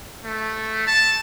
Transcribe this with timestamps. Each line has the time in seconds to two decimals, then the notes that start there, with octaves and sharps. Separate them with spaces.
0.25 A3
0.87 A5